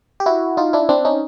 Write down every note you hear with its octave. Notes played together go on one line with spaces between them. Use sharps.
G4
E4 F#4
D#4 F4
D4 E4
C4 D4
C#4 D#4